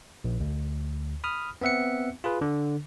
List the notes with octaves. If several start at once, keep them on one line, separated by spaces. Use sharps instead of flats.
A#1
D2
B5 D#6 F6
B3 C4 E5 F#5 C#7
F4 G#4 B4
D3